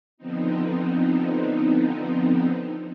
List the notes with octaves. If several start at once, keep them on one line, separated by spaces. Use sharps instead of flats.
D3 F3 B3 C4 D#4